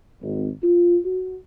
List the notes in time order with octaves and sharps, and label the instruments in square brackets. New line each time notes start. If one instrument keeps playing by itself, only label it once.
[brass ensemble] G#1
F4
F#4